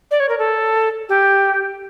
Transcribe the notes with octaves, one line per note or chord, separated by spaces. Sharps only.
D5
C#5
A#4
A4
G4